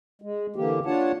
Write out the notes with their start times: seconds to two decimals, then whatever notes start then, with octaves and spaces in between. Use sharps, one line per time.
0.22 G#3
0.56 D3 E3 A#3 G4
0.86 D4 F4 C#5 F#5 A5